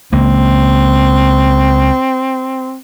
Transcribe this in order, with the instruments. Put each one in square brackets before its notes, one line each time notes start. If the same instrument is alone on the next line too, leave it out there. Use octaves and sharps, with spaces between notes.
[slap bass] C#2 A#3 [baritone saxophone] C4